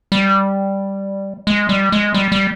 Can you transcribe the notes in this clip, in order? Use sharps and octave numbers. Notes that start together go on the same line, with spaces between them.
G3
G#3
G3
G#3
G3
G3